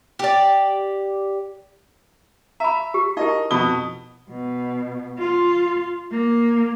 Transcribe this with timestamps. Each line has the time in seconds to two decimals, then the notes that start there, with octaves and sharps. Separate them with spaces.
0.19 G4 D5
2.60 E5 A#5 B5
2.94 G4
3.17 D#4 E4 G4 A#4 D#5
3.51 F2 B2 A5 B5 D#6 G7
4.29 B2
5.18 F4
6.11 A#3